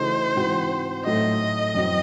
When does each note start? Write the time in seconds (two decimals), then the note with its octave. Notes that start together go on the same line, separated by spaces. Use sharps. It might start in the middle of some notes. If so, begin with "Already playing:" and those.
Already playing: C#3 E3 A3 D#4 F#4 C5
0.36 G#2 E3 C4 F#4
1.05 A2 F#3 A3 D#4 F#4 D#5
1.75 F#2 E3 C4 F#4